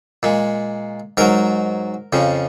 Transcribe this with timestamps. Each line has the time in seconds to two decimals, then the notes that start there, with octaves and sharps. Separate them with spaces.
0.23 A#2 G#3
1.17 G#2 F#3 A#4
2.13 F2 C#3 F3